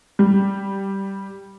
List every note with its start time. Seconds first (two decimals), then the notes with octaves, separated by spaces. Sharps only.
0.19 G3